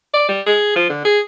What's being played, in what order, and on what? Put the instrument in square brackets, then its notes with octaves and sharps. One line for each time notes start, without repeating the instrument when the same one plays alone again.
[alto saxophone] D5
G3
G#4
F3
D3
G#4